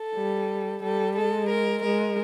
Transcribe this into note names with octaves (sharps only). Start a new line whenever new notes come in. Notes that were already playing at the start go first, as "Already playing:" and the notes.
Already playing: A4
G3
G3 A4
G#3 A4
A#4
G#3 A#4